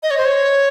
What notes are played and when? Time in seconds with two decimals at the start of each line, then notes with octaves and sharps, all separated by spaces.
0.03 D#5
0.11 C#5
0.18 C5
0.25 C#5